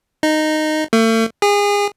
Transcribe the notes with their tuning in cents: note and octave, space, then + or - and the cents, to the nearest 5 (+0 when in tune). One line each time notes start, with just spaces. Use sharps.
D#4 -10
A3 +40
G#4 -30